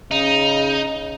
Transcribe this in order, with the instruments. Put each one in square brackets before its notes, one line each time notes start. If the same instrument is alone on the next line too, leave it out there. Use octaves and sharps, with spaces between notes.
[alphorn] C#3 [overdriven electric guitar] D#4